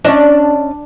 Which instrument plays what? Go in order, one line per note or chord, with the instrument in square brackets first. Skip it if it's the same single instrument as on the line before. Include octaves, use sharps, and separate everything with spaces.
[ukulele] C#4 D5 D#5 [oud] D4